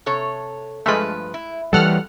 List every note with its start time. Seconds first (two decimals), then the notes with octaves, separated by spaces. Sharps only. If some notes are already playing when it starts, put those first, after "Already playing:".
0.06 C3 A4 C#5
0.86 G2 F3 G#3 A3 B4
1.34 E4
1.73 F2 E3 F3 G3 A4 F#5 F6